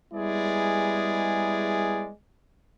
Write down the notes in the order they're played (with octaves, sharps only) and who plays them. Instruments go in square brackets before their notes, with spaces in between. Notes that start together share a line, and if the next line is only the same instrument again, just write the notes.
[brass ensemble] G3 G#3 B3 E4 G#4 D5